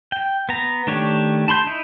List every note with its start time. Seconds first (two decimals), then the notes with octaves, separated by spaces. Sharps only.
0.12 G5
0.49 B3 A#5
0.87 D#3 A3 D4 G4 C#5
1.48 A5 B5 C6 G6
1.67 D#4 E4